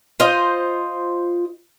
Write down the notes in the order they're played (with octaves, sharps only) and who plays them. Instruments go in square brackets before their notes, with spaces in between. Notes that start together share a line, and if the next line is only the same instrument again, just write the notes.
[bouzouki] F4 C5 D#5